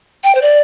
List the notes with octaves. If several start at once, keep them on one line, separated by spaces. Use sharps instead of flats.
G5
C5
D5